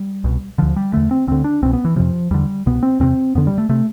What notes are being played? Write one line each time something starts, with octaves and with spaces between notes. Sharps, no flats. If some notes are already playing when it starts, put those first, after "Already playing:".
Already playing: G3
C2 B2
D2 D3 F3
G3
E2 D3 A3
C4
D2 D3 C4
D4
C2 B2 C4
B3
E3
F2 C3 F3
E2 D3 G3
C2 B2 B3
C4
E2 C3 C4
F2 D3 B3
G3
A3
C3 A3